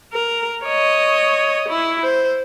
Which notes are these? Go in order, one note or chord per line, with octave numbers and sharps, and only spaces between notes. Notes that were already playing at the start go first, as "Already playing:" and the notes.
A#4
C#5 D#5
E4
C5